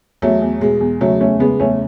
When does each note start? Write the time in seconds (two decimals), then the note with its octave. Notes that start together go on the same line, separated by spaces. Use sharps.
0.22 E2 F#3 A3
0.42 E2
0.61 B2 G#3
0.81 E2
1.01 F#1 F#3 A3
1.21 E2 A3 C#4
1.40 F#1 G#3 B3
1.59 E2 A3 C#4